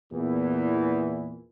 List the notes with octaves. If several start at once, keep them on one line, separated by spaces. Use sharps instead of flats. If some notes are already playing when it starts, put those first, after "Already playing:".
E2 A#2 E3